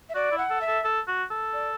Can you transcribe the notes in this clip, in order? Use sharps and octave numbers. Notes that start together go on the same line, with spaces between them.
E5
F#4 D5
E4
F#5
A4
E5
A4
A4
F#4
A4
D5